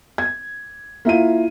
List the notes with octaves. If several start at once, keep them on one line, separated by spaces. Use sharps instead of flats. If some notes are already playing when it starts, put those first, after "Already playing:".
G#6
A#3 E4 F4 D#7